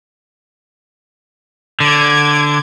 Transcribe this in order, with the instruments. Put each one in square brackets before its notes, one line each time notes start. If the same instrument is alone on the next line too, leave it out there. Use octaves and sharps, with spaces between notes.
[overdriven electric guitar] D3 [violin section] D6 G#6